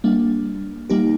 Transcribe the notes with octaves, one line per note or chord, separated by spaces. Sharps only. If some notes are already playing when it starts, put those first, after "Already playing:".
G3 A#3 D4
G3 A#3 D#4 G4